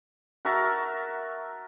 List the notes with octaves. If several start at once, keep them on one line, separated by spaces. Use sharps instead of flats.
F#4 A#4 E5 A5